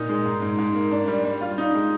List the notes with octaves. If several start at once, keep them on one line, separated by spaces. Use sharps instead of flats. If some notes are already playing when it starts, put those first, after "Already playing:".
Already playing: A#2 D#4
G#3
G#2
G#2
G#2
A#3
D4
G3
G3
F4
D#4
G#3